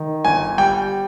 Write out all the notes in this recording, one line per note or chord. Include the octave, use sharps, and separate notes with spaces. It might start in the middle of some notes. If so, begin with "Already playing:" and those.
Already playing: D#3
G1 G#5
G3 G5